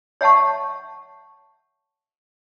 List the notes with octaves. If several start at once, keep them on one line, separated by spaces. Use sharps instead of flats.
C#5 E5 F#5 A5 C#6